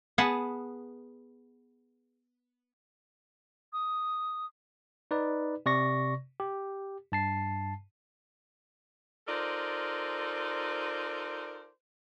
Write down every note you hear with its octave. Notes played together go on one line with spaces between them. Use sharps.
B3 G#4 B4 F#5 A5
D#6
D#4 B4 D5
C3 D5 C#6 A#6
G4
G2 A5 C7
D#4 F4 A4 A#4 C5 D5